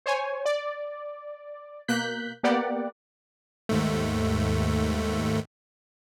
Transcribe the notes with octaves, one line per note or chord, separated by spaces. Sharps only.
C5 C#5 G#5
D5
B2 A#3 F#6 G6 B6
A#3 B3 G4 D5 F#5
D#2 G#2 A3